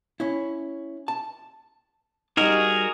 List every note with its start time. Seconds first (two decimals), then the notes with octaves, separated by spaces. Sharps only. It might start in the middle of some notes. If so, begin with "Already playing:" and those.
0.20 C#4 E4
1.08 A5
2.37 G3 D#4 F#4 G#4 A#4